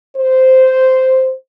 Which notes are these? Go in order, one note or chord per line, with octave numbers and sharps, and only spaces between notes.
C5